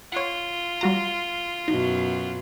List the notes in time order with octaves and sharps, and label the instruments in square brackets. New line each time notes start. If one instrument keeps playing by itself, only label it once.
[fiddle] F4 [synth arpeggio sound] C#5 F#5
[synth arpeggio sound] G3 F#4 A#5
[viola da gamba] F#2 B2 F#3 [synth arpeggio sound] D#4